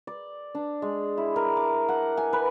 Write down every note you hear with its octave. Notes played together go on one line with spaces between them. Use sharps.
D5
D4
G#3
E4
A#4
D6
F#5
G#5
B4